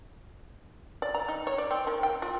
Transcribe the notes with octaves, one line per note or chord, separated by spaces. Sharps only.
D5
A#5
D#4
C#5
D5
C4
D#3
G5
F4